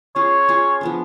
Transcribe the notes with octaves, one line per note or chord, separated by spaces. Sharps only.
C#4 F4 G#4 C#5
C#4 F4 G#4
F3 B3 D4